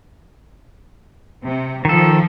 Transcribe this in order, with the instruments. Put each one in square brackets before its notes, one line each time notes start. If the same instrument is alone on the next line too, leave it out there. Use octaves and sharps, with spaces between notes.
[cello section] C3
[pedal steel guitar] D#3 A4 [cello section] F3